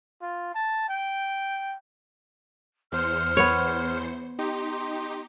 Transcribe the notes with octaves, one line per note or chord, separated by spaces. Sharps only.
F4
A5
G5
E2 C5 F6 C#7
B3 C#5
D#4 G4 C6